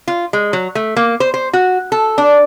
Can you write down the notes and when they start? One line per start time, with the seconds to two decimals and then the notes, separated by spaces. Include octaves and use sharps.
0.08 F4
0.33 G#3
0.53 F#3
0.75 A3
0.96 A#3
1.20 C5
1.34 C5
1.53 F#4
1.92 A4
2.18 D4